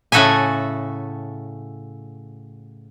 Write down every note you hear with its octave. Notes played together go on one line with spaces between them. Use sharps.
A2 C#3 F#4 A4 E5 G#5